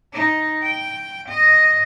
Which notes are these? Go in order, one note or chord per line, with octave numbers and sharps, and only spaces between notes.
D#4
G5
D#5